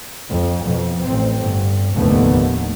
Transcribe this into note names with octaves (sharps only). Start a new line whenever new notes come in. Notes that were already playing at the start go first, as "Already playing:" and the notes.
F2
F2 B2
A1 C4
G1
F1 D#2 A2 D3 A3 B3